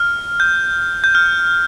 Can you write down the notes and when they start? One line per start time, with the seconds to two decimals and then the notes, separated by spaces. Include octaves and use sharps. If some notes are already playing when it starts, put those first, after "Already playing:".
Already playing: F6
0.40 G6
1.04 G6
1.15 F6